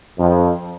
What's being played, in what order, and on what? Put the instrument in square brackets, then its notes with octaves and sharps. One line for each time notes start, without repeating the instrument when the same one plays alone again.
[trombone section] F2